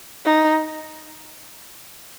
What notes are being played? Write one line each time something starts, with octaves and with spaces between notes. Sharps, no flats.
D#4